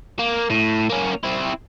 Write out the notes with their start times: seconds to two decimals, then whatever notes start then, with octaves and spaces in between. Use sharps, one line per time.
0.19 A#3
0.50 A2
0.90 A#3 C#4
1.23 C4 E4